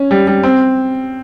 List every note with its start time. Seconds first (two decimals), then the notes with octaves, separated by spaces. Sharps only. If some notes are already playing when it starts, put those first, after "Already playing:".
Already playing: C#4
0.11 G3
0.27 G3
0.44 C4